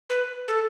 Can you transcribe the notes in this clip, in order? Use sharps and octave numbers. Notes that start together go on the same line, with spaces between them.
B4
A4